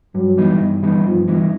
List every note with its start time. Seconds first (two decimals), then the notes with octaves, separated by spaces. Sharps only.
0.15 G2 F#3
0.37 E3 G3 B3 D#4
0.61 G2
0.82 E3 G3 B3 D#4
1.05 G2 F3
1.28 E3 G3 B3 D#4